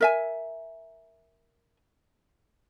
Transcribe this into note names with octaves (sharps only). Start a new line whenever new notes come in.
A#4 E5 G#5